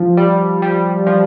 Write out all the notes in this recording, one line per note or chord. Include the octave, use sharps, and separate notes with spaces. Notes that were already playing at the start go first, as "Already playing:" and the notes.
Already playing: F3
G3
G3
F3